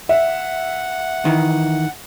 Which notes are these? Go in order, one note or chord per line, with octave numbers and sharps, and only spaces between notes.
E5 F#5
D#3 E3